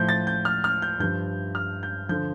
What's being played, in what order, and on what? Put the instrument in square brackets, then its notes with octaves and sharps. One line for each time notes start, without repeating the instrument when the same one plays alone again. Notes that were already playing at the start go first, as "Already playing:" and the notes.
Already playing: [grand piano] A2 F3 G6
A6
G6
F6
F6
G6
G2 F3 G6
F6
G6
D3 F3 G6